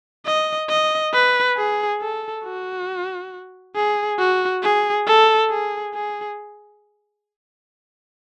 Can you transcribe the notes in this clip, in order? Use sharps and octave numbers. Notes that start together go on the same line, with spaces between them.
D#5
D#5
B4
G#4
A4
F#4
G#4
F#4
G#4
A4
G#4
G#4